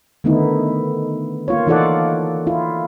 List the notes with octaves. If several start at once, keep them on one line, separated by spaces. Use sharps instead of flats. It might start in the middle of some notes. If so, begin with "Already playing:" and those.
D3 D#3 A3 B3 D#4 E4
A#3 F4 C#5
E3 D#4 F4 A4 D5 F#5
E4 F4